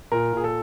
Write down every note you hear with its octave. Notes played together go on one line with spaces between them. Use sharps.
A#2 A#4
A#2 G#4
A4